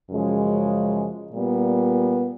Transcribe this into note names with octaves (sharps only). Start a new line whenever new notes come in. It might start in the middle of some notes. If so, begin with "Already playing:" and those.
F#2 C#3 F3 G#3
A#2 G3 B3